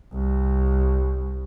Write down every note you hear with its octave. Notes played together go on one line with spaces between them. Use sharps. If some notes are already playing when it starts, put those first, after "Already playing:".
C2